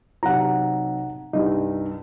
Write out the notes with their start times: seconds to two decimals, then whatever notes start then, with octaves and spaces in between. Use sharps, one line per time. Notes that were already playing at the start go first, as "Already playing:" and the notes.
0.23 B1 C3 F#5 A#5
1.33 C2 G2 D#4